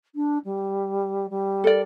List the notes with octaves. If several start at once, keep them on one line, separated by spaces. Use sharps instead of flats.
D4
G3
G3
A4 A#4 D5